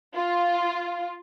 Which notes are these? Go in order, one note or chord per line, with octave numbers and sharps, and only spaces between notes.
F4